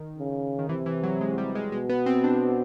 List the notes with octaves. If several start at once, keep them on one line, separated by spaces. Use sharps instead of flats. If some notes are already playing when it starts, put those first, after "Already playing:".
Already playing: D#3
C#3
D#3
C3 E3
E3
F#3
G#3
G3
G#3
B2 G#3
B3
C4
D4